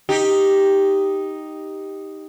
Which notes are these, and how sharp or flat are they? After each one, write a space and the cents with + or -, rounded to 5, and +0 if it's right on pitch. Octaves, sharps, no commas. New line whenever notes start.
D#4 +0 G4 +0